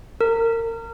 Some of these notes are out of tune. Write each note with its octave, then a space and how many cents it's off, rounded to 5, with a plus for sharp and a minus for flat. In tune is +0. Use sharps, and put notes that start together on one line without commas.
A#4 -30